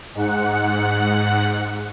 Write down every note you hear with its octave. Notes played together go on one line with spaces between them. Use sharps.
G#2 F#5